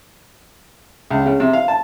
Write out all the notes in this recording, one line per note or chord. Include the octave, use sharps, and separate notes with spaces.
C#2
C#3
C3
F5
A5